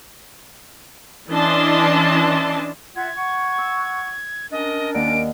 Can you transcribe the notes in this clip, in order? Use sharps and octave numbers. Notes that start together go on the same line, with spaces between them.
E3 C#4 D4 D#5 A5 C6
F4 E5 F#5 G#6
F#5 C#6
E6
C#4 D4 A#4 D#5
D#2 D5 F#5 D7